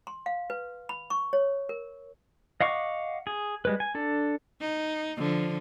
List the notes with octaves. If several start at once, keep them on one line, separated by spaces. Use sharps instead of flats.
C6
F5
B4
B5
C#6
C#5
A#4
D#5 F5 F#5 C#6 D6
G#4
G3 G#3 B4
G#5
D4 A4
D#4
D3 F3